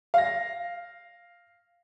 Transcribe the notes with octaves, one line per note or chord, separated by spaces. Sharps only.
F5 A#6